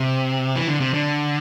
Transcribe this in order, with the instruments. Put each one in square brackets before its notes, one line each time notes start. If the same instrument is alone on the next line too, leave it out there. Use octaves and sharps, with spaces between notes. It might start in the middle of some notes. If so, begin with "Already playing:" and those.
Already playing: [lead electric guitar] C3
E3
D3
C3
D3